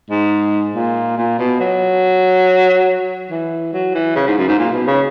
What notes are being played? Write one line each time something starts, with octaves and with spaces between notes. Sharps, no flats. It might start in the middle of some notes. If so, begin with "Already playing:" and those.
G#2
A#2
A#2
B2
F#3
E3
F#3
E3
C#3
G#2
F#2
G#2
A#2
B2
C#3